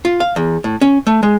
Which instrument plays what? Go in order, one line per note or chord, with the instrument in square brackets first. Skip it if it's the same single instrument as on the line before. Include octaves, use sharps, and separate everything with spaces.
[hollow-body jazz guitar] F4
F5
E2
A2
C#4
A3
G#3